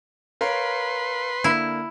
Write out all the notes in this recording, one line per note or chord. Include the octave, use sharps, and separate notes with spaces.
A#4 B4 C#5 F5 C6
D3 A#3 E4